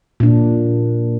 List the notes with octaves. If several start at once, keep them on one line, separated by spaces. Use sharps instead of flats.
A#2 D4